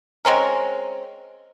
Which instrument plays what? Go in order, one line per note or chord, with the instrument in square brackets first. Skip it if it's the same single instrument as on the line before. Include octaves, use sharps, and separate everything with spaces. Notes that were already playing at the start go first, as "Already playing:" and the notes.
[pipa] G#3 C4 C#4 A#4